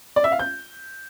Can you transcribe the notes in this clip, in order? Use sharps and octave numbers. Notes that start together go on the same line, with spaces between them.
D5
E5
F5
G6